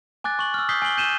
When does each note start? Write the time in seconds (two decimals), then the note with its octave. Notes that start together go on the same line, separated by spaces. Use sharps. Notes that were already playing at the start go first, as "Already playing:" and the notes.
0.24 G#5 D6 F#6 A6
0.39 C#6 F#7
0.54 E6 F6
0.69 D#6 E6 G6 B6 C7 G7
0.82 G#5 C7 F#7 G7
0.97 G6 D#7 E7 G7